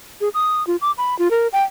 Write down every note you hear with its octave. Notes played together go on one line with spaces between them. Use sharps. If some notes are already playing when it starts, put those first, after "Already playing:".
G#4
D#6
F4
D6
B5
F4
A#4
G5